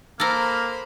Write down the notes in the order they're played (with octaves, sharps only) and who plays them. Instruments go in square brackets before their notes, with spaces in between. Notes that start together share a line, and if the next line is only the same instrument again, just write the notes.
[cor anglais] A#3 [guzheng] A4 A#4 [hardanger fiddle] C5 B5